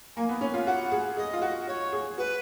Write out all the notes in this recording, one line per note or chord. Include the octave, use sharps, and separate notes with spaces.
A#3 G#5
B3
C#4
F4
F#4 F#5
G#4
G#4 D#5
F4
F#4
F#4 C#5
G#4
F#4 B4